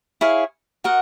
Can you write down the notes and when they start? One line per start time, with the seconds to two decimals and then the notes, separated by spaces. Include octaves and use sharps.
0.21 E4 G#4 C#5 F5
0.84 F#4 A#4 D#5 F#5